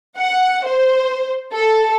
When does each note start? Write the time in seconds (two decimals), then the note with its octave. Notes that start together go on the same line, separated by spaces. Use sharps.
0.16 F#5
0.65 C5
1.53 A4